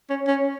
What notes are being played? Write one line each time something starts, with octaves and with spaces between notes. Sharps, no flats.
C#4
C#4